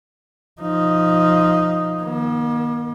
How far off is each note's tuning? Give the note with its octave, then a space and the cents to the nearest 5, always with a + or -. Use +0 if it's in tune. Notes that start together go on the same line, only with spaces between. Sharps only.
F3 +0 D#4 +0
D#3 +0 A#3 +45